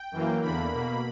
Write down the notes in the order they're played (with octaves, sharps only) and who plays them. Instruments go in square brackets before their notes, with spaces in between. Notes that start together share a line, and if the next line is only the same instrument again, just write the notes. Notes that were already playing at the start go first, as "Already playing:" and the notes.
Already playing: [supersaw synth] G5
F#2 E3 A#3
E2 D3 A#3 B5
B2 A#3